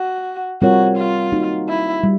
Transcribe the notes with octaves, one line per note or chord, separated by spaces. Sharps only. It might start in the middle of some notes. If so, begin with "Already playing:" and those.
Already playing: F#4
G3 C4 F4 F#4 A#4 C#5
F4
A#3 D#4 F#4
E4
G3